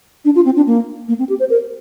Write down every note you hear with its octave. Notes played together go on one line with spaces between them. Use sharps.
D4
F4
C4
D4
A#3
A#3
C4
G4
C5
A#4